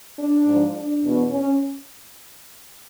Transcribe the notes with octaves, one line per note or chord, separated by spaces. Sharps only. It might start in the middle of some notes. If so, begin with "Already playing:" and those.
D4
G#2 F3
D4
E2 B2
C#4